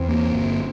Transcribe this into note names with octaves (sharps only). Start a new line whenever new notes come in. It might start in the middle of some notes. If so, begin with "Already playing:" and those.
Already playing: E2 C4
A#3
G1